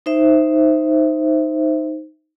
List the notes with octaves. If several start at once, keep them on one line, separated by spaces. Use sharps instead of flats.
D#4 C5 E5